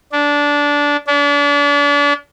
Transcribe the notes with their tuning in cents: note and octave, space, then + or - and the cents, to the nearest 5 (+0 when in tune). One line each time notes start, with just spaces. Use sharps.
D4 -15
D4 -35